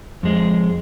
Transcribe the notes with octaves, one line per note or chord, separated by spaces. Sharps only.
F2 G#3